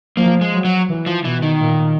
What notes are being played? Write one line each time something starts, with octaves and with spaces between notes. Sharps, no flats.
F3 A#3
G#3
F#3
F#3
E3
F3
B2 E3
D#3
A#2